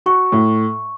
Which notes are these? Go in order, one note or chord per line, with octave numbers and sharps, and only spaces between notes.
F#4 C#6
A2